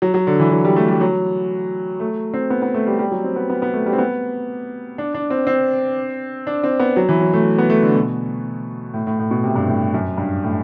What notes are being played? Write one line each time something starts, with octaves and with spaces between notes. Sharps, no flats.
F#3
F#3
D3
E3
F#3
G3
A3
G3
F#3
A3
C4
B3
B3
A3
G3
G3
F#3
C4
B3
B3
B3
A3
G3
C4
B3
D4
D4
C4
C4
D4
C4
B3
F#3
E3
F#3
A3
B3
A3
D3
B2
A2
A2
A2
B2
C3
G2
A2
F#2
G2
A2